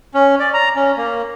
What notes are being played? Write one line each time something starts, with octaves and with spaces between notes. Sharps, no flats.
C#4
D5
A#5
C#4
A#3